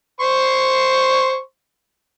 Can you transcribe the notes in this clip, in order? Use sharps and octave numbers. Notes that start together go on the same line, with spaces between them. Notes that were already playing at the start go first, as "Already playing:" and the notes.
C5 C6 C#6